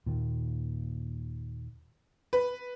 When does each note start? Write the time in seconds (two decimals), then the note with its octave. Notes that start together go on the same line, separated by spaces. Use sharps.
0.06 D#2 A#2
2.33 B4